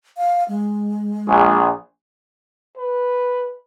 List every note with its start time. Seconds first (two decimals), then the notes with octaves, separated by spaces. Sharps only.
0.17 F5
0.48 G#3
1.28 A#1 G#4
2.77 B4